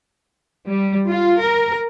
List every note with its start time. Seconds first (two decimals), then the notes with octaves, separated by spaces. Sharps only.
0.67 G3
1.09 F4
1.40 A#4